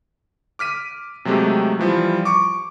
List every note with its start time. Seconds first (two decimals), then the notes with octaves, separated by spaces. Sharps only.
0.59 D6 F6 B6 D#7
1.25 C3 F#3 G#3 A3 G4
1.79 E3 F3 G3
2.25 C#6 D6